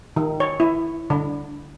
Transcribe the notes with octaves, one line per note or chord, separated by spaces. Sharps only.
D#3
C#5
E4
D3